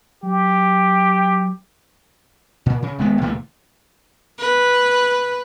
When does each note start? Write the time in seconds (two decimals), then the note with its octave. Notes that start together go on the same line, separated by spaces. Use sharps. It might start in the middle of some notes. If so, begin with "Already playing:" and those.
0.23 F#3 G4
2.66 A#2
2.82 C#3
2.99 D#1 G#3 B3
3.21 C#2 A#2 E3 A3
4.39 B4